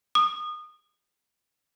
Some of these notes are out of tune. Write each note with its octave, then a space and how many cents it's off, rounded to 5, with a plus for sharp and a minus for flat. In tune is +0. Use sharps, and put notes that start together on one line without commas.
D#6 -25